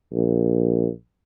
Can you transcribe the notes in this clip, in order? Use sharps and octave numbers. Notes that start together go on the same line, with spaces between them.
A#1